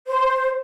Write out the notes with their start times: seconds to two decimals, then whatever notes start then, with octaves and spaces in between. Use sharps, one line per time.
0.07 C5